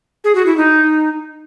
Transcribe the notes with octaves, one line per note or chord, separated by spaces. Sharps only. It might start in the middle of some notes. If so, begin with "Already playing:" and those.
G#4
F#4
E4
D#4